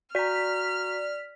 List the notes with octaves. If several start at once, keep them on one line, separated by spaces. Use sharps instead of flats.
F#4 D5 A#5 F6 B6